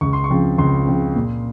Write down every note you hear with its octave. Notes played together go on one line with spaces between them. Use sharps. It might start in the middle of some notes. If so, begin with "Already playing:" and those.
C#2 C#6
C6
C#6
C#3 F3 C4
C#2 C6
C#3 F3 C4
A#2